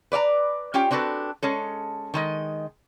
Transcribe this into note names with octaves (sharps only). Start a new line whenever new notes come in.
B4 D5 E5 A#5
C#4 F4 G4 G5
C4 D4 F#4 A4 B4
G#3 C#4 A4
D#3 G#3 D#5